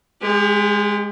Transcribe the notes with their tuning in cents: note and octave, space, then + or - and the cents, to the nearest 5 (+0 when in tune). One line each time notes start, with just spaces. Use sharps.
G#3 -5 G4 +35